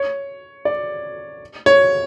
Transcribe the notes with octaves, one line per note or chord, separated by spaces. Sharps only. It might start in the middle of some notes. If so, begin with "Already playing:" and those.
Already playing: C#5
D5
C#5